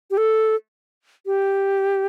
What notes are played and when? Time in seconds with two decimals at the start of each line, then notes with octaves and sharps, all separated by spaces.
0.11 G4
0.17 A4
1.26 G4